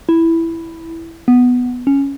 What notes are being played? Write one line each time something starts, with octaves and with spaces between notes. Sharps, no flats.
E4
B3
C#4